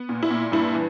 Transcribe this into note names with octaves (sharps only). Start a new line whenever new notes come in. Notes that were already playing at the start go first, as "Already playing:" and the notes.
Already playing: B3
A#2
E4
A#2
G2 E4
E3